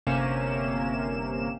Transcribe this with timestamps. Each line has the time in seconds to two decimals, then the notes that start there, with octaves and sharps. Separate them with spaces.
0.07 G1 C3 A#3 C#4 E7